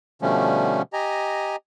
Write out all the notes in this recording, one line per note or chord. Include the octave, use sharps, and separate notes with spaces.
B2 D3 F3 G3 A3 C#4
G4 D#5 G#5 A#5